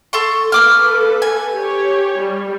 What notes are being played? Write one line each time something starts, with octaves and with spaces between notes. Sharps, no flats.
A4 C6 C#6
A#3 A4 B4 D6 F6
G#5
G4 C#5
G3